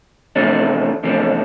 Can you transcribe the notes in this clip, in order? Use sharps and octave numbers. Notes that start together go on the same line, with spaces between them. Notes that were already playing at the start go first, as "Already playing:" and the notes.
E2 C3 F3 A3 D4
E2 C3 F3 A3 D4